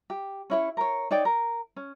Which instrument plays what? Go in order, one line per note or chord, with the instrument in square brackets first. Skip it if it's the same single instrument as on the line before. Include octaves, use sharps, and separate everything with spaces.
[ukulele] G4
C#4 E4 C#5
A#4 C#5
D#4 C#5 D5 G5
A#4
C#4